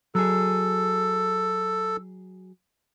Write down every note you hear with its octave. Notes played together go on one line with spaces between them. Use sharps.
F#3 G#4 A4